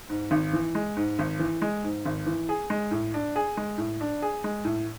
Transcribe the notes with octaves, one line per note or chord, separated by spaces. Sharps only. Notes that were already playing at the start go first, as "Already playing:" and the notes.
G#2
G#1
E3
G#3
G#2
G#1
E3
G#3
G#2
G#1
E3
G#4
G#3
A2
D4
G#4
G#3
A2
D4
G#4
G#3
A2